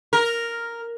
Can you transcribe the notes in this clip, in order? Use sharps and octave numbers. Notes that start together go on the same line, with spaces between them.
A#4